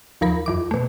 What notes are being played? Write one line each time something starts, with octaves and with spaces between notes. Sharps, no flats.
D#2 F3 A#4 B5
F2 E3 D6
B2 A3